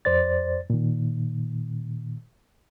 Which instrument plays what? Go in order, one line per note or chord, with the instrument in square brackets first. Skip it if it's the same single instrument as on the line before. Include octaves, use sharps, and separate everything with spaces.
[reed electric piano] F2 C5 D5 A6
A#2 D#3